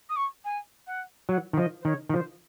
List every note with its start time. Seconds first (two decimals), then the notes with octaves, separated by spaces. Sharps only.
0.09 D#6
0.16 C#6
0.44 G#5
0.86 F#5
1.29 F#3 F#5
1.53 D#3
1.57 F3 D#5
1.81 C5
1.85 D#3 C#5
2.09 D#3
2.14 F3 C5